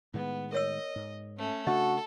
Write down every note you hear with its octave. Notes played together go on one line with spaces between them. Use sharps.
A2 D#3 G#3 B3
A#4 C#5 D#5 E6
G#2
A3 C#4
C#3 A3 D4 F#4 A4 D#5